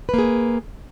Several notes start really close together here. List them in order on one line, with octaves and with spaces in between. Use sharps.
B4 A#3 G#4